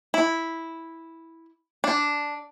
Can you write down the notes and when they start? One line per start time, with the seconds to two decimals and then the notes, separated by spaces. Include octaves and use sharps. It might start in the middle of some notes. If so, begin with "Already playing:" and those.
0.14 E4
1.84 D4